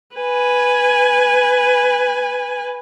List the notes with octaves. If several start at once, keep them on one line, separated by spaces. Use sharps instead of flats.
B4 G#5